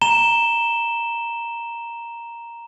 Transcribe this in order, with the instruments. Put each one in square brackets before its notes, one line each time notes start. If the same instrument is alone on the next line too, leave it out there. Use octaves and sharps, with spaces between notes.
[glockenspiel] A#5 E7 G7